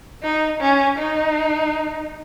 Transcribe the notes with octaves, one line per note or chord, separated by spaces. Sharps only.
D#4
C#4
D#4